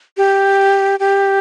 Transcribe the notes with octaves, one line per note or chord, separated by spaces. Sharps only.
G4
G4